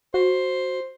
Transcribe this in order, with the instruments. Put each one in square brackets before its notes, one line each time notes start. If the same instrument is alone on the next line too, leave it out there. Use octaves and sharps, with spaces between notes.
[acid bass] F#4 [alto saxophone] C5